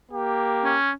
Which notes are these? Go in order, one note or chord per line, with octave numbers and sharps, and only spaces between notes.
A#3 G4
C#4